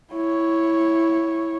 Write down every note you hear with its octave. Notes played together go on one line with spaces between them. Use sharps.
E4 C#5